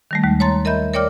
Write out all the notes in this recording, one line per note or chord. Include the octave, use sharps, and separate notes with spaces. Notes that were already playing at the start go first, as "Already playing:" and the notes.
D#3 G3 A3
D#2 G#3
C#5 A5 A#5 C6 A6
A#4 D#5 E5 B5 G6
A#4 C#5 D5 G5 D6 F6